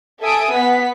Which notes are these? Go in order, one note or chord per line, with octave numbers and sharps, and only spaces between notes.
A4 E5 G#5 D#6 D7
B3 F#5 B6